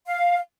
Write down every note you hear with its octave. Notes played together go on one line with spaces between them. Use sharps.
F5